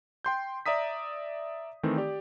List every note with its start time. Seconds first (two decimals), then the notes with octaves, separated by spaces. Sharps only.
0.25 G5 C6 G6
0.66 D5 E5 A#5 D#6 B6
1.83 D#3 E3 A3 C4
1.98 G4 D5